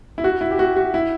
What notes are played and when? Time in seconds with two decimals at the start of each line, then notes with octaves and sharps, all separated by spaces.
0.18 E4
0.24 F#4
0.41 E4
0.51 G4
0.59 F#4
0.76 F#4
0.94 E4